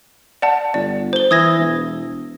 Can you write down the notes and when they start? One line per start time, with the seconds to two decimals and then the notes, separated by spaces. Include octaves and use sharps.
0.42 D5 F#5 A5
0.74 G1 D5
1.13 C5 G7
1.31 E3 D#6 G#6 A#6
1.59 E1